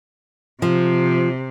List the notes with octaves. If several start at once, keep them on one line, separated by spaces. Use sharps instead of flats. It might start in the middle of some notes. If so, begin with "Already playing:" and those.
C3 F3